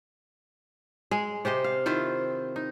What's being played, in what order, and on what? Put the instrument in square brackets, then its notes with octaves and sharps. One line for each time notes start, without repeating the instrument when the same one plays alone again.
[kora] G#3 G#4
C3 G4 C5 D#5
F5
D#3 E4 F4 C5
D#4